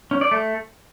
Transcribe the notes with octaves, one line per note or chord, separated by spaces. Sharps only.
C#4
D5
A3